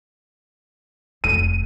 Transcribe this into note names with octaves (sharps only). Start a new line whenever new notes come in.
F1 C4 D#7